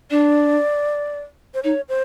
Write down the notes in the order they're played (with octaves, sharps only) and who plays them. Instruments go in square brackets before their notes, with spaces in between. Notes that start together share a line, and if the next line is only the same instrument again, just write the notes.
[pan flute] D4 [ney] D5
[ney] C5
[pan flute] D#4 [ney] C#5
[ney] C5